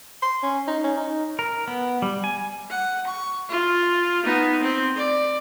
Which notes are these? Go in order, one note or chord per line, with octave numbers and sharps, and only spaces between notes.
C6
C#4
D#4
C#4
D#4
A#4
B3
G3
G#5
F#5
C#6
F4
B3 D#4
C4
D5